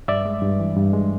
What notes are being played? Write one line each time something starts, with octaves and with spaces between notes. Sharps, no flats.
G2 D5 E5
G#3
G2
E3
G2
G#3